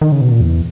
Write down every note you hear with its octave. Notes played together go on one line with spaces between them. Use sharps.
D#3
C#3
B2
A#2
E2